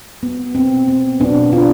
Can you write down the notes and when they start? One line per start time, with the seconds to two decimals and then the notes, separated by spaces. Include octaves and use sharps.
0.23 B3
0.55 B2 C4
0.88 B3 C4
1.20 B2 B3 D4
1.53 B3 D4 F4